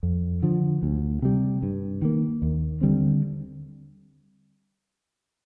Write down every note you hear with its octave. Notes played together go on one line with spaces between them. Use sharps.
F2
D3 F3
D2
C3 G3
G2
D#3 A#3
D#2
D3 G3 C4